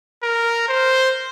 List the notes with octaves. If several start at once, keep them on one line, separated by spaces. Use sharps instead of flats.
A#4
C5